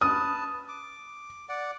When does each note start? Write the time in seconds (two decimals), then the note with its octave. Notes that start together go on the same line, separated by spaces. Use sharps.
0.01 B4 A5 D#6
0.68 D6
1.49 D5 F#5